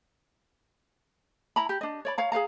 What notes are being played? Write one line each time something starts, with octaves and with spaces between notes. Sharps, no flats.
E4 A#5 B5
G4
D4 D#5
C#5 D5 B5
C#5 F5 A#5
G#4 B4 F5 A#5